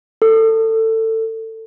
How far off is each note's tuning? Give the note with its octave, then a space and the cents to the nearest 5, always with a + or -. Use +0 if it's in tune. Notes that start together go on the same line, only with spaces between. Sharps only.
A4 +25